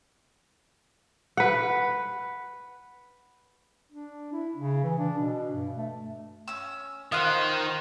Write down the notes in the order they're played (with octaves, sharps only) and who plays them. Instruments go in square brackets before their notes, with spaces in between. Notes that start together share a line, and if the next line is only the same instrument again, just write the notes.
[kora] B4 F#5
[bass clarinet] D4
E4
C#3
E3
D4
B2
G2
A3
[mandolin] C#4 E6
[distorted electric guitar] D#3 [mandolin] F4 C5 F#5 [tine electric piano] D#6 F6 F#6